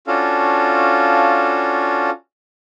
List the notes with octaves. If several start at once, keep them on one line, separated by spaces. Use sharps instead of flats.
C#4 D4 F4 F#4 A4 F5